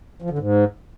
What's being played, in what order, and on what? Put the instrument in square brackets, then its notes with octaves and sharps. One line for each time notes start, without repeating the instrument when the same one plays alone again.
[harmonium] F3
D3
G#2